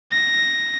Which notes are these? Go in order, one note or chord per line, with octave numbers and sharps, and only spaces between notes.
A#6